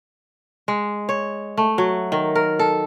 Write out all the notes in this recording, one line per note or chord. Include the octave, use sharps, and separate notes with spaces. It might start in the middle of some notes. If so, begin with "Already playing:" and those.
G#3
C#5
A3
F#3
D#3
A#4
A4